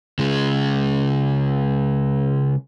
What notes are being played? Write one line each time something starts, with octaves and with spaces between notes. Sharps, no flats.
C#3 G#3